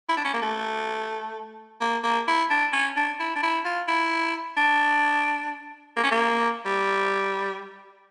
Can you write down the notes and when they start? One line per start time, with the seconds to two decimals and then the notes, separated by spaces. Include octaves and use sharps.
0.09 E4
0.17 D4
0.25 C#4
0.34 A#3
0.42 A3
1.81 A#3
2.04 A#3
2.27 E4
2.50 D4
2.72 C#4
2.96 D4
3.19 E4
3.36 D4
3.43 E4
3.65 F4
3.88 E4
4.57 D4
5.97 A#3
6.03 C#4
6.11 A#3
6.65 G3